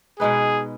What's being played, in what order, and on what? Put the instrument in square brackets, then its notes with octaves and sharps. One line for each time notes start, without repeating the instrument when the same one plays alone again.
[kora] B2 G#3 D#4 B4 [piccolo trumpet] G#4